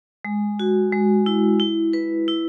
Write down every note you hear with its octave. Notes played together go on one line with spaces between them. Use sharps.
G#3
F#4
G#3
E4
E4
B4
E4